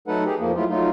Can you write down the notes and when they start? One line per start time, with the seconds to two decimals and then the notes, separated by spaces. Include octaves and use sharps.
0.08 F#3 A3 D#4 A4 B4 F#5
0.26 G4 G#4
0.40 F2 F3 A#3
0.56 F#3 A3 E4 F4
0.69 F#3 A3 D#4 F4